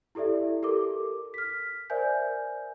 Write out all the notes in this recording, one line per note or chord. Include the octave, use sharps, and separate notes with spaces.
E4 G4 A4 D5 E5
G4 A4 A#4 D6
F6 B6
A#4 C5 D5 E5 G#5 G6